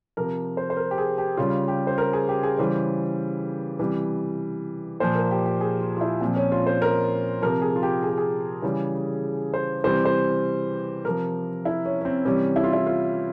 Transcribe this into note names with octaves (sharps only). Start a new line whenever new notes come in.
C3 F3 A#4
C5
C5
A#4
G4
G#4
G4
C#3 G3 F4
G4
C5
A#4
G#4
G4
G#4
C#3 E3 G3 C5
C3 E3 G3
A#2 F3 C5
A#4
G4
G4
G#4
F4
F4
E4
A#2 F3 C4
C#4
F4
C5
A#4
C3 F3 A#4
G#4
F4
G4
G#4
G4
G#4
C#3 E3 G3
C5
C3 E3 G3 C5
C5
C3 F3 A#4
E4
C#4
C#4
C4
C3 E3 G3 C#4
E4
F4
E4
F4